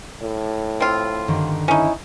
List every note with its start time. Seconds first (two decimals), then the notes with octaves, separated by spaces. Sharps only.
0.22 A2
0.80 C4 F4
1.28 G2 D3 D#3
1.68 C#4 D#4 E4